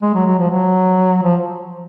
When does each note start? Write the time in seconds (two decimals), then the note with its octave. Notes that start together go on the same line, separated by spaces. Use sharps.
0.02 G#3
0.15 F#3
0.27 F#3
0.39 F3
0.50 F#3
1.23 F3